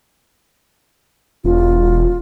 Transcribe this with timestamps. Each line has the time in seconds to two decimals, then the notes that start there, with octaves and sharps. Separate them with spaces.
1.44 E1 F4